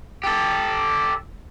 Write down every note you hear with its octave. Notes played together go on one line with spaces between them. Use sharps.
G4 A4